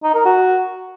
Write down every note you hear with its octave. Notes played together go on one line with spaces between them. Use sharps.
D#4
A#4
F#4